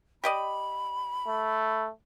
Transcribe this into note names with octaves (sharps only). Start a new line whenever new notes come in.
G4 D5 D#5 B5
A3